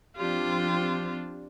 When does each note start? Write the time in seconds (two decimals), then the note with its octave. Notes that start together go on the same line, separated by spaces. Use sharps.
0.17 F3 C4 D4 F4 G4